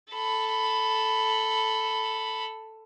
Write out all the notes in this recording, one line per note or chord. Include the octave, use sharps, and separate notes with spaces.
A4 B5